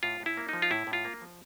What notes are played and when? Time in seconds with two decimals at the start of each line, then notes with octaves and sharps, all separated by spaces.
0.03 A2 F4
0.20 A2
0.26 E4
0.37 A#3
0.49 F3 D#4
0.62 F4
0.71 A2 E4
0.87 A2
0.93 F4
1.05 A#3
1.21 F3